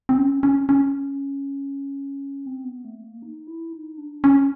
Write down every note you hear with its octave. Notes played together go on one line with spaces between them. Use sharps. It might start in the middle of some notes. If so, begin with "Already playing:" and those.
C4
C#4
C#4
C#4
C4
B3
A3
A#3
D#4
E4
D#4
D4
C#4